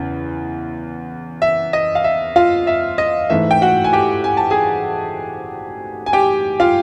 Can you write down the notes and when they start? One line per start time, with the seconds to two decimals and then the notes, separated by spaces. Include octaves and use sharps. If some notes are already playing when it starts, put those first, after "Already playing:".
Already playing: E2 C#3 E3
1.42 E5
1.73 D#5
1.95 F5
2.04 E5
2.36 F4 F5
2.67 E5
2.98 D#5
3.30 G#2 E3 A3 E5
3.51 G5
3.62 F#4 F#5
3.84 G#5
3.93 G4 G5
4.24 G#5
4.37 A5
4.50 G#4 G#5
6.06 G#5
6.13 G4 G5
6.60 F4 F5